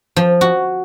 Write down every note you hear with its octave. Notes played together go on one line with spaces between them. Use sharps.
F3
F#4